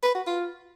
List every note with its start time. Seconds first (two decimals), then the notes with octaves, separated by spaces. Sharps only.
0.03 B4
0.15 F#4
0.27 F4